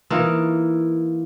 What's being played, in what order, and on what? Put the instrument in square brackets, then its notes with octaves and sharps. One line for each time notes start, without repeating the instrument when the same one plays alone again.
[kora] E3 A#3 D#4 F4